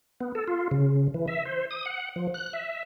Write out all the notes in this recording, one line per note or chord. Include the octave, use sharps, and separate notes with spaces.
B3
A4
F4
C#3
E3
E5
C5
D#6
F#5
F3
F#6
E5